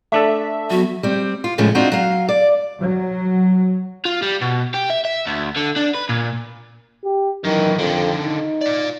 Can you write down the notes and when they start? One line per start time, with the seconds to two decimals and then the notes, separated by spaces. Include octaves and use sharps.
0.12 A3 D4 A4 E5
0.70 F#3 B3 F#4
1.03 G3 C4
1.44 F4
1.58 A2 C#3 F3 G#3 C#4
1.75 C4 D4 D#4 F4 F#4
1.92 F#3 F5
2.29 D5
2.82 F#3
4.05 F4
4.22 G3
4.41 B2
4.74 G4
4.90 E5
5.05 E5
5.27 D2
5.56 D3
5.76 D4
5.94 B4
6.09 A#2
7.04 G4
7.44 F#2 D#3 E3
7.78 F2 D3 D#3
8.24 D#4
8.61 F4 D5